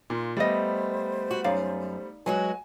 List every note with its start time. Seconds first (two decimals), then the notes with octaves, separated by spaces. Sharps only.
0.10 A#2 D#4 F4
0.37 G3 A3 B3 C5 D5 D#5
1.31 F#4
1.44 F#2 D#4 D5 F5
2.26 F#3 G#3 F#4 B4 G#5